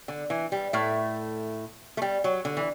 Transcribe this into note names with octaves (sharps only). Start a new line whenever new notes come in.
D3
E3
G3
A2 A3
A3
G3
F#3
D3
E3